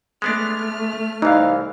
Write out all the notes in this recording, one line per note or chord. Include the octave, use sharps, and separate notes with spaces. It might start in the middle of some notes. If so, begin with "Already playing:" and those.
G#3 A3 B3 D4 F6
C2 E3 D#4 F5